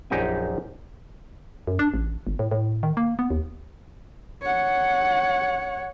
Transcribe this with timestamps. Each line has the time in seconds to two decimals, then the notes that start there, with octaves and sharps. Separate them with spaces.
0.10 A#1 F#2 D#4 G4 D#5 G#5
1.67 F#2
1.79 D4
1.94 A1
2.27 G1
2.39 A2
2.51 A2
2.83 D#3
2.97 A#3
3.19 B3
3.30 D#2
4.42 C#5 F#5